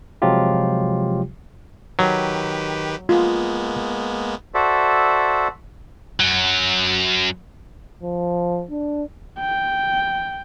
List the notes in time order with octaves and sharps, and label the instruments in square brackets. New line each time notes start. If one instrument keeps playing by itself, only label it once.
[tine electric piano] C3 F3 F#3 G#3 F4 G4
[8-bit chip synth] D#3 G4 B4 [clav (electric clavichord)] F#3
[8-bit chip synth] G#3 A#3 B3 [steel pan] F4
[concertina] F#4 A4 C5 D5 E5
[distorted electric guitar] F#2 F#3
[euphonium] F3
D4
[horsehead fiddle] G5